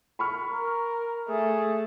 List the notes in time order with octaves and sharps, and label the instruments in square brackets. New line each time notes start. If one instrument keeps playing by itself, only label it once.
[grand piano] B5 C#6 F6
[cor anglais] A#4
[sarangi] A3 [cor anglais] G#4